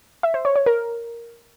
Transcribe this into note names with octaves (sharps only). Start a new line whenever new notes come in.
E5
C5
C#5
C#5
A#4